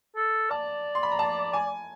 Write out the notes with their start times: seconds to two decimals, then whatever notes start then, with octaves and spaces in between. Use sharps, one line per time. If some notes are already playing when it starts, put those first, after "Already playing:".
0.16 A4
0.50 D5 A5
0.95 C6
1.03 B5
1.12 A#5
1.19 A5
1.53 G#5